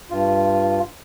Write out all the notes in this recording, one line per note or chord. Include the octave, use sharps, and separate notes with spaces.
G2 F4